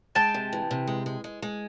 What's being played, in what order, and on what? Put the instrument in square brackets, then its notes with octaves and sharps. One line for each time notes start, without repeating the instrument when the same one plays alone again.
[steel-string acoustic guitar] G#3 [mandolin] G5 A5
[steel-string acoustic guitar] C3
E3
C3
G#3
G#3
G#3
G#3